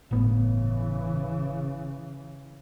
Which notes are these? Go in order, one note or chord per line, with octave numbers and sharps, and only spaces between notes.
G1 A2 C#3 E3 B3